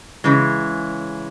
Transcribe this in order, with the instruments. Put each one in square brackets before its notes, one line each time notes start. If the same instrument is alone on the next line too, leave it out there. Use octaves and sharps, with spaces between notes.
[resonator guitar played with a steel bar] C#3 E3 G#3